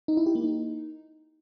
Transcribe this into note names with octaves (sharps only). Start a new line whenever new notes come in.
D#4
E4
G4
A#3
D#4